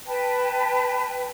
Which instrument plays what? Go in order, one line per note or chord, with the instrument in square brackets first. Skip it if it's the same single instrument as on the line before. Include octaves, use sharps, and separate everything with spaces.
[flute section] B4 G5 A5